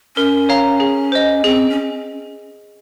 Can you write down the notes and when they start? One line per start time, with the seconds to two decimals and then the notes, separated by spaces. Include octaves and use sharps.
0.16 C#4 A#4
0.49 C#5 F5 A#5
0.80 G#4
1.12 C5 D#5
1.44 C4 G#4
1.70 C#4